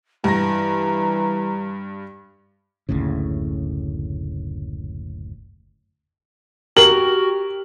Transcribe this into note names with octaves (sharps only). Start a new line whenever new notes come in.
G2 E3 A#5 A#6
F#1 D2 A2 C#3
F#4 G4 A#4 F#7